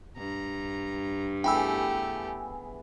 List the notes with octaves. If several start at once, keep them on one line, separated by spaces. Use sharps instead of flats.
G2 A#5
E3 A3 B3 G4 G#4 G5 B5 E6